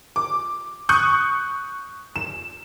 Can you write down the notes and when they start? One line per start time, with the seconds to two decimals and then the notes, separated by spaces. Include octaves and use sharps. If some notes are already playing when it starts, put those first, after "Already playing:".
0.16 D6
0.89 C#6 D#6 F#6 G6 C#7
2.16 E7